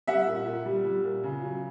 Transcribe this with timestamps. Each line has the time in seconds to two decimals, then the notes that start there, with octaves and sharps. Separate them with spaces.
0.07 G3 E5 F#5
0.27 A#2
0.45 A#2
0.65 G3
0.84 G3
1.03 A#2
1.24 C#3
1.43 F#3